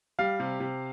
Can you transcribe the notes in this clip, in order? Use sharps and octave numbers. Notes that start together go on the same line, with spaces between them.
G3 F5
C3
C3